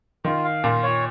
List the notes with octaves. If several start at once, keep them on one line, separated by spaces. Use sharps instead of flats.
D#3 F4
F5
A#2 F4
C#5